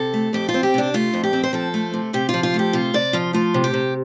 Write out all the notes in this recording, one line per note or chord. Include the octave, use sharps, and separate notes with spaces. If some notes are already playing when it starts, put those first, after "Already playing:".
Already playing: C3 A4
A3
F2 G4
F4
C4
G4
C3 D4
A3 F4
F2
G4
C4
C5
F3 A4
A3
C3
C3 G4
F4
F3
F4
A3
G4
C3 F4
C3 D5
F3 F4
A3 F4
C3
G4
C3